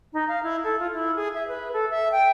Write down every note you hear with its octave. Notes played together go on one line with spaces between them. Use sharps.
D#4
F5
E4
A4
F4
E4
G#4
E5
B4
A4
E5
G5